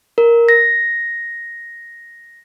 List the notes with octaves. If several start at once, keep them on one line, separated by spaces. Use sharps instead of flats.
A#4
A#6